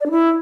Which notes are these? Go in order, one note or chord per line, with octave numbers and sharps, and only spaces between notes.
D5
D4
E4